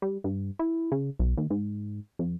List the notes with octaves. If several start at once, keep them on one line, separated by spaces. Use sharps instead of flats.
G3
G2
E4
C#3
B1
D#2
G#2
F2